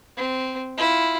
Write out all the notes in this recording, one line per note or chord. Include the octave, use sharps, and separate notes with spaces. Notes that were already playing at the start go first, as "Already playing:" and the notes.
C4
E4 F4